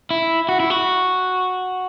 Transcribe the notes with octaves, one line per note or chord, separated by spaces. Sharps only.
E4
F#4
E4
F#4